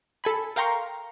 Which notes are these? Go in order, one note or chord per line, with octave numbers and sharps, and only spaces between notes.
A4 G#5 B5
A#4 F5 G5 A#5 C6 C#6